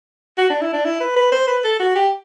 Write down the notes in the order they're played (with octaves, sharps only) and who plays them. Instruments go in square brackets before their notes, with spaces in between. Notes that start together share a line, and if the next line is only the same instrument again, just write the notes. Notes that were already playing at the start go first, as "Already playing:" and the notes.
[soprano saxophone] F#4
D4
E4
D4
E4
B4
B4
C5
B4
A4
F#4
G4